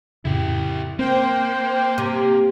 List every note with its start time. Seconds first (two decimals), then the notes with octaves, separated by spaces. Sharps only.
0.25 F2 A2 C#3 E4 G4
0.99 A#3 C4 C5 G5
1.98 C3